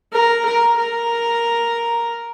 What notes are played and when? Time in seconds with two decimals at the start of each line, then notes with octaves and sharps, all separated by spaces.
0.12 A#4
0.45 A#4
0.77 A#4